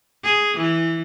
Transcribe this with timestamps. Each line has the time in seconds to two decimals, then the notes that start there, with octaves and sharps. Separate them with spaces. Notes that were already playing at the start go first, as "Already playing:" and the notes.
0.24 G#4
0.57 E3